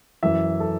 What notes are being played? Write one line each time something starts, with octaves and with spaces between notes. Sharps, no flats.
F#2 E3 E5
A4